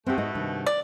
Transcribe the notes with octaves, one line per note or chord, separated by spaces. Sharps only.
B2 A3 C4 G4
G#2 D#5
G2 C3 D#3
D5